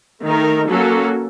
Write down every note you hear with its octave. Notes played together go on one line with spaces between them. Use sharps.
D#3 A3 D#4 A#4
F#3 A#3 C#4 F#4 A4